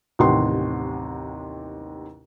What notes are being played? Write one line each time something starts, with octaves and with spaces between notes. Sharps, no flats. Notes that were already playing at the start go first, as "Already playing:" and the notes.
A1 D#2 C3 F#5 G5 C6